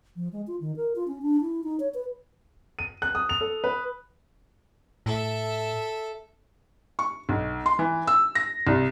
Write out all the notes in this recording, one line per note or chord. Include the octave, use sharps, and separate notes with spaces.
F3
G#3
F4
D#3
A#4
F4
C#4
D4
E4
D#4
C#5
B4
D#7
F#6
D#6
F7
A4
B4
A2 A4 E5
C#6
B1
C6
E3
E6
A#6
C2